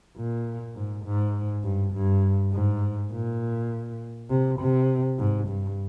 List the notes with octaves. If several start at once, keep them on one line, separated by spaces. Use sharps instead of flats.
A#2
G#2
G#2
G2
G2
G#2
A#2
C3
C3
G#2
G2